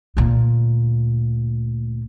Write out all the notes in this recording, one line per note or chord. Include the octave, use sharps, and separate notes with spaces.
D2 A#2